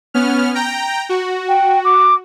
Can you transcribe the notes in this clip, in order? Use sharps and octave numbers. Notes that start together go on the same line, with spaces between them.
B3 C#4 F6
G5 A#5
F#4
G5
D6